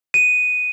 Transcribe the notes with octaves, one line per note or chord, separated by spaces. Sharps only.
D#7